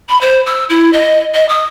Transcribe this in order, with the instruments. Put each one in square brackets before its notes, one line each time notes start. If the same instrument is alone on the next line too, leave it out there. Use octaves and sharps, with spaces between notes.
[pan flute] B5
C5
E6
E4
D#5
D#5
D#6